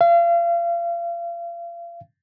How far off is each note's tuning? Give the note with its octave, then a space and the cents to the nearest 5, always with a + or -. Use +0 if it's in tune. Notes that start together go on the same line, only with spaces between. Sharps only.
F5 -35